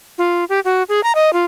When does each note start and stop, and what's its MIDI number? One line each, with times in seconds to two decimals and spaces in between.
0.18 0.44 65
0.49 0.60 67
0.65 0.83 66
0.89 1.01 68
1.04 1.12 82
1.15 1.33 75
1.33 1.45 65